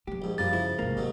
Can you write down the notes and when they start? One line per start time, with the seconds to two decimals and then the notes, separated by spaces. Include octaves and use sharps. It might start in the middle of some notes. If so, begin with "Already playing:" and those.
0.07 F#3 A#3 G4
0.22 A#1 G#2
0.38 F#2 F3 G3 A#3 A6
0.53 C#3 F3 E4
0.79 G#1 C3 A#3
0.97 D#2 G#2 F#3